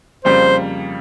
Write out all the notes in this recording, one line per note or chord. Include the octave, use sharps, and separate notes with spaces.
F2 C#3 G3 A#3 C5